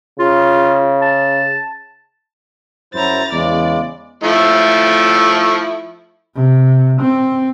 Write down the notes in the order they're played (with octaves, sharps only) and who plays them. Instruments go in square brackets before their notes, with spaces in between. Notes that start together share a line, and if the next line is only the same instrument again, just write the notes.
[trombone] C#3 [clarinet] F4
[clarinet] A5
[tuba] F#2 [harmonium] F#3 E4 C5 [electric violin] A#5 A6
[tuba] E2 [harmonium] C#3 G#3 [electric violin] D5
[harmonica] F3 A3 E4
[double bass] C3
C4